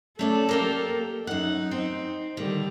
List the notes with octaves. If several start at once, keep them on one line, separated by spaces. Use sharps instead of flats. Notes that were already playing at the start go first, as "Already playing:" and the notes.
A3 C#4 A4 D5
A#3 G4 A#4
F#2 D#4 F#5
C4
D3 D#3 G3 G4